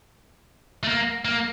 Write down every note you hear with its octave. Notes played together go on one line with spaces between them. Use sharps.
A3
A#3
A#3